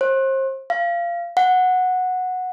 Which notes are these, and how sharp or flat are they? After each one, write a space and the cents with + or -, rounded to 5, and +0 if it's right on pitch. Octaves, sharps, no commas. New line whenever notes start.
C5 +35
F5 -20
F#5 -10